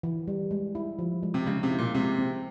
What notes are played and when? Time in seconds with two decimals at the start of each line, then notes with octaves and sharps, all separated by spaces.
0.03 E3
0.28 G3
0.51 G#3
0.75 E4
0.99 F3
1.23 G#3
1.34 C3
1.46 C#3 G#3
1.63 C3
1.70 E4
1.78 A#2
1.95 C3 G#3
2.19 C4